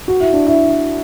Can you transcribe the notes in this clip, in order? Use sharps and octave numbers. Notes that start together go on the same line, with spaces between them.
F#4
E4
D4
E4